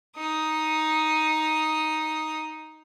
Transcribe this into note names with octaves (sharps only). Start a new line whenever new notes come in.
D#4 D#6